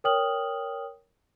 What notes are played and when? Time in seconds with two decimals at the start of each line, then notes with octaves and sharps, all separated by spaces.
0.04 A#4 C#5 G5 D#6 F6 F#7